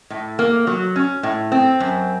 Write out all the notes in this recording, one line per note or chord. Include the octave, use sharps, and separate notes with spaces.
A2
A#3
F#3
C#4
A2
C4
F#2